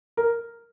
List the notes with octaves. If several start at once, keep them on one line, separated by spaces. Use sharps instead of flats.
A#4